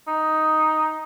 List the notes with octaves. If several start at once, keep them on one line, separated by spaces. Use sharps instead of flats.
D#4